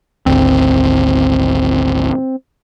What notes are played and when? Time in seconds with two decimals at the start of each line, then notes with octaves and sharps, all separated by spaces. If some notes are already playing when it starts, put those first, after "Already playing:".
0.26 G#1 D2 C4